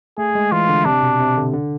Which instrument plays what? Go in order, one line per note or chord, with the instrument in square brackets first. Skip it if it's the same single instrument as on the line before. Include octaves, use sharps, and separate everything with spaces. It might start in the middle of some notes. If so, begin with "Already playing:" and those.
[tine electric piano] A3 [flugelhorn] G#4
[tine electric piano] G#3
[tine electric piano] E3 [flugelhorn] F4
[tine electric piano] D3
[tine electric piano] C3 [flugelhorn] D4
[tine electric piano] B2
C3
D3
D3